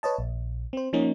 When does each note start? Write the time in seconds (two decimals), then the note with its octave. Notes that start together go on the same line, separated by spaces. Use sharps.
0.03 B4 C#5 D#5 A5
0.19 A#1
0.73 C4 C5
0.93 F3 A#3 C#4 D#4